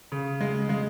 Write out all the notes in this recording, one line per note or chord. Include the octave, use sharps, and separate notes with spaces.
C#3
G#3
G#3